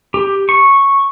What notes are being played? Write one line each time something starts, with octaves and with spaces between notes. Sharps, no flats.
G4
C#6